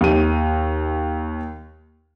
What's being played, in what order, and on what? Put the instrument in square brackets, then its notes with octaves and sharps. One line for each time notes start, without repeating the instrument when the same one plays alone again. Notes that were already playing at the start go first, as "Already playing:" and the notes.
[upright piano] D#2 D#7